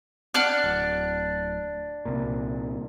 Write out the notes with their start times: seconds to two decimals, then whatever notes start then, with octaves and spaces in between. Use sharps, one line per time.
0.34 D4 F#5 F6
0.64 D1
2.05 C2 A#2